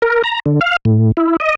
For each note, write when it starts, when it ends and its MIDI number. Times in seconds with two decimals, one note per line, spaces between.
0.02 0.22 70
0.24 0.40 82
0.46 0.60 50
0.61 0.76 77
0.85 1.12 45
1.17 1.37 64
1.40 1.55 75